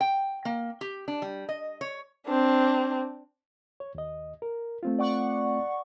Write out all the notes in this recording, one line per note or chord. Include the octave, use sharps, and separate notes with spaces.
G5
A#3
G4
D4
G3
D#5
C#5
C4 D4
C#5
D#2 D#5
A#4
A3 C4 F4
D5 F#5 C#6